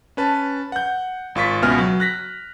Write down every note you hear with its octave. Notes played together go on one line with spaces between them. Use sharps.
C#4 B4 A5
F#5 G6
G#1 F4 C#6 B6
C#2 B2 B3 E5 G#5 F6
F#3
F#6 A#6 B6